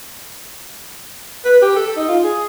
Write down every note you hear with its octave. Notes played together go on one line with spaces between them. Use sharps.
B4
G4
A4
D#4
F4
G#4